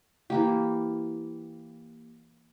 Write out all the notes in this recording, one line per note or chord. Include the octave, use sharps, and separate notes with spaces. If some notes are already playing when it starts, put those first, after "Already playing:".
E3 A#3 G4